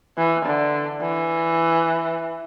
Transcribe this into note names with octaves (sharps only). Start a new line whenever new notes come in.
E3
D3
E3